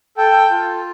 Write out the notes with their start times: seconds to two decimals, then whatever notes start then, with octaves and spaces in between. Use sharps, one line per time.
0.17 A4 G5
0.51 F4